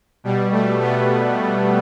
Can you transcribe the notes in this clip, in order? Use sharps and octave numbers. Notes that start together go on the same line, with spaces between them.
B2 G3
A3
B3